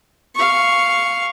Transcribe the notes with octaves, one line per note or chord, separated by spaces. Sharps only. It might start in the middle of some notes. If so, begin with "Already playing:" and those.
F5 C#6